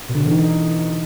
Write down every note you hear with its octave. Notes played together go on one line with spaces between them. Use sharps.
B2
D3
B2
E3
D#4